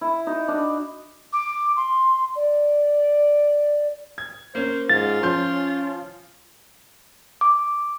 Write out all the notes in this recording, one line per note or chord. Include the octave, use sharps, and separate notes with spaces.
E4
D#4 F#4
D4
D6
C6
D5
G#6
A#3 C#4 C5
G#2 F4 A6
F3 C#4 C6 G6
D6